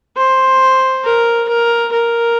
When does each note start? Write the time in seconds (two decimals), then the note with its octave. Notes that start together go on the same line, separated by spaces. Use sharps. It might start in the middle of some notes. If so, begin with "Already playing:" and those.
0.17 C5
1.05 A#4
1.48 A#4
1.93 A#4